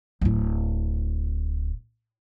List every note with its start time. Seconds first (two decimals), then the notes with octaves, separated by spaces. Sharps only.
0.21 D1 E4